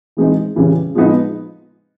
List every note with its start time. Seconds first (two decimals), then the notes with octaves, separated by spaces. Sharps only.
0.17 E3 G#3 C4 D#4
0.56 C#3 E3 G3
0.95 F3 G#3 B3 D#4